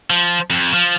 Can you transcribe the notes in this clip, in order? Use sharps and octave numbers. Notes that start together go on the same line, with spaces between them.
F3
F2
F3